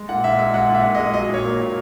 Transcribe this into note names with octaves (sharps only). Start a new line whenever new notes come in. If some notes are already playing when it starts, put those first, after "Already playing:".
Already playing: G#3
A#2 F#5
A#2 E5
G#3 E5
G#3 F#5
A#2
E5
A#2
D#5
G#3
F#3 D#5
A#2 C#5
A#3
A#2